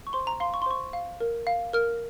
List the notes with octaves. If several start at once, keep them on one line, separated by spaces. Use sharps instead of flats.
C#6
C5 C6
A#5
F5 C6
C#6
C6
C5 C#6
F5
A#4
F5
A#4 F6